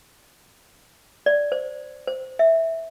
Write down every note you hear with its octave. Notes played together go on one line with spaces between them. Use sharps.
D5
C5
C5
E5